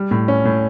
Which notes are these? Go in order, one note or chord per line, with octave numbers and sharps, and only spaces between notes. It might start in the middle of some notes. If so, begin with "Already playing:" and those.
Already playing: G3
A2
C#4
A2